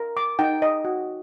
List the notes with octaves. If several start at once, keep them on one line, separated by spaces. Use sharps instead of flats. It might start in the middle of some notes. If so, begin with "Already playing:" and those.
Already playing: A#4
D6
D#4 G5
D#5
F#4